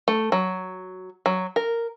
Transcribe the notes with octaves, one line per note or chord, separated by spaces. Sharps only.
A3
F#3
F#3
A#4